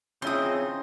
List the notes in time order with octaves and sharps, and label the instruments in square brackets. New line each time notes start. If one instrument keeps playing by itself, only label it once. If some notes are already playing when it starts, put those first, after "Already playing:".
[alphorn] C#3 [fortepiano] F3 C#4 E4 [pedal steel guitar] C4 D#4 [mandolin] C6 D#6